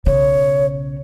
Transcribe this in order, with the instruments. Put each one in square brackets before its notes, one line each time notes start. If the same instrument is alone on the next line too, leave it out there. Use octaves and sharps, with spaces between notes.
[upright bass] B1 C#3 [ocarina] C#5